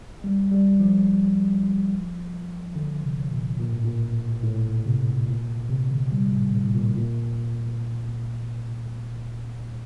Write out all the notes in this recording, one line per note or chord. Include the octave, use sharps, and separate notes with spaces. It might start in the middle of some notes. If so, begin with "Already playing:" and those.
G3
G3
F3
D3
C3
A#2
A#2
A2
A#2
A2
C3
A#2
C3
D3
G3
A2
A2
A#2
A#2